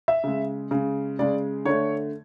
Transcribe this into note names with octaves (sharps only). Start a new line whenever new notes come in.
E5
C#3 G#3
C#3 G#3
C#3 G#3 D5
D3 A3 C#5